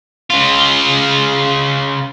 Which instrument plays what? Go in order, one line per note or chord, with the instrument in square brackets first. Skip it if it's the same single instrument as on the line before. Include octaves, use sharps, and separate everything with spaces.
[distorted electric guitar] C#3 F4